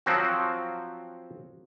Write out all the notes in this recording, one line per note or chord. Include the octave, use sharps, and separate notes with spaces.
F3 F#3 C4 F#4